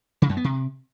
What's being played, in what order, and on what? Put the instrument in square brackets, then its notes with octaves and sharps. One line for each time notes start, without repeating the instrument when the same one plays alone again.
[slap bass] C#3
F#2
B3
C3